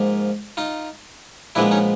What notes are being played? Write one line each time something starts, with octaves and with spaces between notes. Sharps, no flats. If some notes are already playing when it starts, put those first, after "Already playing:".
Already playing: G#2 F3 A#3
D#4 F4
A#1 A#2 F3 G#3 B3 D4 E4
C#4 D#4